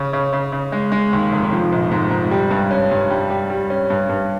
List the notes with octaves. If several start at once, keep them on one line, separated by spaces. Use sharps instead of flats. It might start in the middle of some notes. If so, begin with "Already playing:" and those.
Already playing: C#3
C#3
C#3
C#3
G#3
G#3
D#2
F1
F3
A#1
G#2
G#2
G3
G2
C#4
G2
G3
G3
G3
C#4
G2
G2